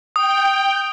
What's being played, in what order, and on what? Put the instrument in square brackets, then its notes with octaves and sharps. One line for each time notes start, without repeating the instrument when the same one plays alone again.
[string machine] G5 [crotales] D#6